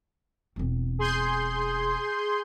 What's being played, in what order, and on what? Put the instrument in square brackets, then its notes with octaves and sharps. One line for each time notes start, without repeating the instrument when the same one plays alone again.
[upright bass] E1 C4
[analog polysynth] G#4 C6 G6